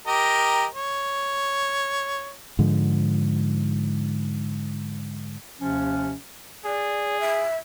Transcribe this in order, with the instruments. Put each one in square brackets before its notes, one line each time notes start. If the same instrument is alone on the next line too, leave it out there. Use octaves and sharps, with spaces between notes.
[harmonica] G4 A#4 D#5
C#5
[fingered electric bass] G#2 D3 F3
[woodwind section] D#2 C3 F3 C#4
[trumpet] G#4 [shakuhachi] D5
[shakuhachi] E5